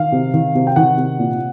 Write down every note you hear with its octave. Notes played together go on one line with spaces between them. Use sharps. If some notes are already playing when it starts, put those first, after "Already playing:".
Already playing: D#3 F5
C3
D#3
C3
G5
D#3 F#5
C3
A#2